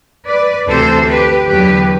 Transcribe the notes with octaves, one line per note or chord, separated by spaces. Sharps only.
B4 D5
D2 C3 E3 A4 C5
G4 B4
E2 D3 F#3 G4 B4